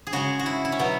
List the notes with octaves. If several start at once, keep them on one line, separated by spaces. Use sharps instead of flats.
G#4
C#3 G#3 F#4
F#4
E4
E4
C#4
B2 F#3 B3